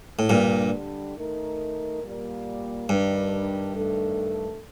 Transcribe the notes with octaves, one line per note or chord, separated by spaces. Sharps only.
A2
G2 A#2 D3 G3 D4
D#3 A3 D#4 A#4
A#2 G3 A#3
G2 D#3 G3 D4
D#3 A3 D4 A4